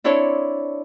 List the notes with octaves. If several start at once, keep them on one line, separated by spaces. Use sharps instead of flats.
C4 D4 E4 A4 C#5 D5